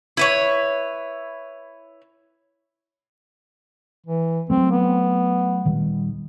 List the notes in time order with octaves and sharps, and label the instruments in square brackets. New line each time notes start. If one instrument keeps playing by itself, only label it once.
[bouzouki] E4 B4 C#5
[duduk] E3
[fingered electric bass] F#3 A3 [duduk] C4
[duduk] B3
[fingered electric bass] D#1 D#3 G3